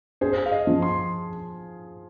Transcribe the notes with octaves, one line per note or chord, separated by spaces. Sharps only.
G#4 C5
F5
D#5
F3
C6